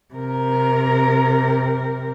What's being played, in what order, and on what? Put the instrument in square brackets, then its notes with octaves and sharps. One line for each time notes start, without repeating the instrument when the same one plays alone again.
[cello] C3 A#4